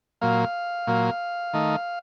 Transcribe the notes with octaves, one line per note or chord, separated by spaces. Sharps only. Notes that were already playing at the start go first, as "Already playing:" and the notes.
A#2 F#3 A#3 F5
A#2 F#3 A#3
D#3 A3 D#4